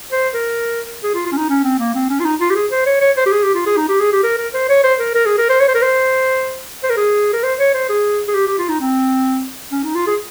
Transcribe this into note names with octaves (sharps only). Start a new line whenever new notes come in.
C5
A#4
G#4
F4
F4
C#4
D#4
C#4
C4
A#3
C4
C#4
F4
D#4
F4
G4
G#4
C5
C#5
C#5
C5
G4
G#4
G4
F4
G#4
D#4
G4
G#4
G4
A#4
A#4
C5
C#5
C5
A#4
A#4
G#4
A#4
C5
C#5
C5
A#4
C5
C5
A#4
G#4
A#4
C5
C#5
C5
G#4
G#4
G4
G4
F4
D#4
C4
C#4
D#4
F4
G#4